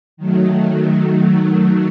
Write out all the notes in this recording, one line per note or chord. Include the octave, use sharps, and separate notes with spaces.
D#3 F#3 A3